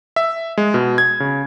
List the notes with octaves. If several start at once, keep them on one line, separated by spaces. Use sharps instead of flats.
E5
G#3
B2
G#6
C#3